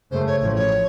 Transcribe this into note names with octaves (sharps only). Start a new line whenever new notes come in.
F#2 C#3 A3 C5
C#5
A1 A2 F3 C#5
C#5